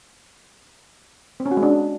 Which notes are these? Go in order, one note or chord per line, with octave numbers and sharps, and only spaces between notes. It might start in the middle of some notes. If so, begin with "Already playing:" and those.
C4
C#4
F#4
G#3
D4